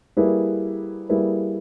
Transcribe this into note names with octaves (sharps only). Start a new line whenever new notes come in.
G3 A#3 E4 G#4 B4
G3 A#3 E4 G#4 B4